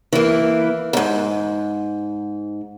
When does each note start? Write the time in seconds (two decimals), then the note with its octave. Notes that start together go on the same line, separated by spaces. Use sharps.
0.13 E3 A#3
0.93 F2 G#2